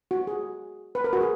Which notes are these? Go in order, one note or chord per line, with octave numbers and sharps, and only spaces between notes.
F#4
G#4
B4
A#4
F#4
G#4